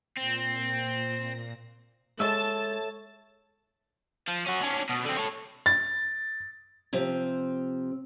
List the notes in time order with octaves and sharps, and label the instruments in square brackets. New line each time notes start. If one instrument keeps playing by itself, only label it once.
[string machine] A#2 A#6 [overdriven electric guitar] C4
[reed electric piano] G#3 [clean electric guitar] A4 C#5 E5 [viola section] A5
[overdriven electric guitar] F3
C#4 F#4
C#4 D4
B2
D3 C4
A4 C#5
[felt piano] A6
[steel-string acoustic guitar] C3 F3 C4